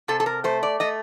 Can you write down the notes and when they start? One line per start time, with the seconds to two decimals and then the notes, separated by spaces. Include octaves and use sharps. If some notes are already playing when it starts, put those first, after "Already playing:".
0.08 C3 A4
0.20 A4
0.26 A#4
0.44 A3 C5
0.63 D5
0.80 A3 D#5